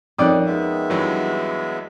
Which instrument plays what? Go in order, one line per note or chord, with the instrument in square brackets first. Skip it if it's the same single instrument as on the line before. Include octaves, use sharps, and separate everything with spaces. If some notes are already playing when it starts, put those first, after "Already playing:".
[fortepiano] F2 D5 [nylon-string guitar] C#4 D#4 A#4 [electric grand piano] D#6 F#6
[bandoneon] G#3 B3 E5
[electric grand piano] G2 E3 F#3